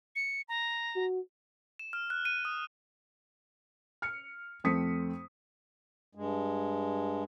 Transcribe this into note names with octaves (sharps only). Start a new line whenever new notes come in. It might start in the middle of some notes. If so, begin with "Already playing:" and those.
C#7
A#5
F#4
E7
F6
F#6
D#7
D#6
F6 C#7
F2 A3 C4 D#6 B6 C#7
G2 G#3